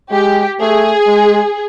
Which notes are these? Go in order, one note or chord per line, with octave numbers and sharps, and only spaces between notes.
G#3 G4
A3 G#4
G#3